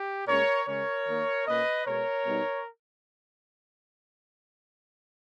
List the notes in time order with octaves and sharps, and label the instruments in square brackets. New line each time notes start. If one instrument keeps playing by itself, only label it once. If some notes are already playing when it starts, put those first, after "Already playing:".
Already playing: [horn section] G4
A#2 G#3 C#4 A#4 C#5
C#3 G#3 C#4 A#4 C#5
D#3 A#3 D#4
A#2 A#3 C#4 B4 D#5
B2 G#3 B3 A#4 C#5
B2 G3 B3 D#4